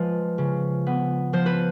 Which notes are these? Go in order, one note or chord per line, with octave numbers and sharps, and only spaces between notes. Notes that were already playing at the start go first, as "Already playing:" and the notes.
Already playing: F3 G#3 B4
C#3
B3
F3 C5
B4